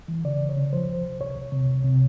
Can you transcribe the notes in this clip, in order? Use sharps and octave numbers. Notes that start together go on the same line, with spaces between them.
E3
C#3 D5
C#3
C#5
C#3
F3 C5
C2
C2
C2 C#5
C2
C3
C2
C3